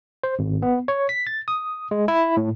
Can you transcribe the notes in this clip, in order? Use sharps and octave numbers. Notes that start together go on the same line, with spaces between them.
C5
G#1
B3
C#5
B6
A6
D#6
G#3
E4
A2